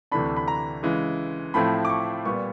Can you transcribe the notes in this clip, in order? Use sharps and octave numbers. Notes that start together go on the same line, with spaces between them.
D2 C3 E3 A3 D4 B5
B5
A#5
C#3 E3 G#3
A2 F3 A3 C4 E4 B5
D6
C#6
A#2 G3 B3 C#6